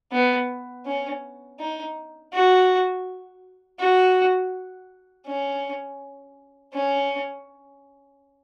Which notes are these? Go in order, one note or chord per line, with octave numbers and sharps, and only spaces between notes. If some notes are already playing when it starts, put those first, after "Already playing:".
B3
C#4
D#4
F#4
F#4
C#4
C#4